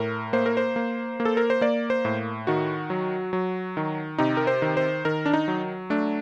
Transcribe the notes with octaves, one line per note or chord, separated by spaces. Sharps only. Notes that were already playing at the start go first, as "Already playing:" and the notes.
Already playing: A2 A#4
A#3 C5
A#4
C5
A#3
A#3
A4
A#4
C5
A#3 D5
C5
A2
D#3 F#4
F#3
F#3
D#3
C3 D#4
A#4
C5
D#3
C5
D#3 A#4
D4
D#4
F#3
A3 D4